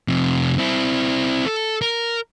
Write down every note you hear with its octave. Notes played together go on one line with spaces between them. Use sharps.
F2 C3
C4 E4
A4
A#4